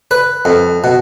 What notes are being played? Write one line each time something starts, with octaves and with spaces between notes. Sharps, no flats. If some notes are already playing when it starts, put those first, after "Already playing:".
B4
F2
B2